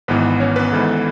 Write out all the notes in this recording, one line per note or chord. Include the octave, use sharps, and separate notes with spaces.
G#1 G#2 E3 B3 B4
C#4 C#5
B3 B4
G#1 G#2 E3 A4